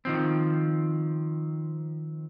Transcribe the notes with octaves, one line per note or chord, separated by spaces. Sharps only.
D#3 F3 C4